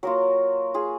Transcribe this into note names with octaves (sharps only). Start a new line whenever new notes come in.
F#3 A#3 F4 F#4 A#4
F4 G#4